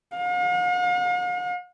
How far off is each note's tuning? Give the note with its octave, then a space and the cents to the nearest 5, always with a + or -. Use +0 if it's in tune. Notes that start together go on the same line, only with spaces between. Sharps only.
F5 +45